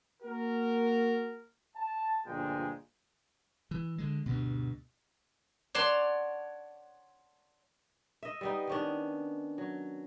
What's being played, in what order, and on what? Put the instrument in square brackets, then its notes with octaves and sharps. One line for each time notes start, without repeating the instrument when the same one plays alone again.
[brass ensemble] A#3 F#4 A#4
A5
G1 A#2 F3 G#3 G5
[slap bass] E3
D3 G#3
D2 G2 B2
[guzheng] C#5 D5 F#5 A5 C6
[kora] D#5 E5
G3 B3 D#4
D#3 C#4 D4
F#3